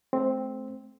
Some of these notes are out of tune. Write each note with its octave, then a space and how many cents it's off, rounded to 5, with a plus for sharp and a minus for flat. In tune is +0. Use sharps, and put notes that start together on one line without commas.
A3 -30 C4 +0